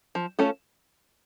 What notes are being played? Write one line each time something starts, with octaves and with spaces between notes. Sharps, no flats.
F3
A3 C#4 F4 A4